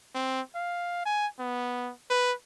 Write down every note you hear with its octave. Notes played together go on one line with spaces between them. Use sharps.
C4
F5
G#5
B3
B4